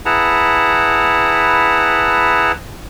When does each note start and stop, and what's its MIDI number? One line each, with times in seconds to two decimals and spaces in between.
0.06 2.52 64
0.06 2.52 68
0.06 2.52 71
0.06 2.52 78
0.06 2.52 81
0.06 2.52 82